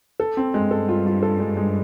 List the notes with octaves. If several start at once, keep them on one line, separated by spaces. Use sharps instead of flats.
A4
C4
G2 G#3
A4
F4
F4
A4
G#3
G#3